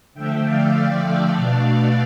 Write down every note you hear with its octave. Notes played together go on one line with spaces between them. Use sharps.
D3 F3 A3 E5 G5
D5 F5
B2 A3 D4